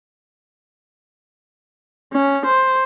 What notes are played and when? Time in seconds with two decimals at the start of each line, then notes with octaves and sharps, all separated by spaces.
2.13 C#4
2.45 C5